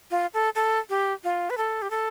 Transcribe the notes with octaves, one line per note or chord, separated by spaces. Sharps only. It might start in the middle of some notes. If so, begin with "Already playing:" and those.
F4
A4
A4
G4
F4
B4
A4
G4
A4